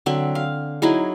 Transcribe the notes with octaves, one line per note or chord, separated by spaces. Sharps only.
D3 F#3 C4 E5
F5
F#3 D#4 E4 G#4